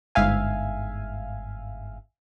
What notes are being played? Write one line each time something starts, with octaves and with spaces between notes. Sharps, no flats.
G1 G#2 E5 F5 G#5